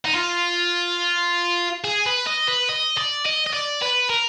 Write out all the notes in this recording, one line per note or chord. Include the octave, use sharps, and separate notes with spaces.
D#4
F4
G#4
B4
D#5
B4
D#5
D5
D#5
D#5
D5
B4
A#4